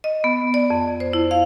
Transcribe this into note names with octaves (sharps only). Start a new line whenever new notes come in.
D#5
B3
D5
F2
C5
E4
F5